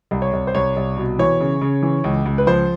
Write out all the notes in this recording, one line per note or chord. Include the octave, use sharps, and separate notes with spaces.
C2
C#5
C2
C5
C2 C#5
C2
B2
E3 C#5
C#3
C#3
E3
C#2
C#2
B4
F3 C5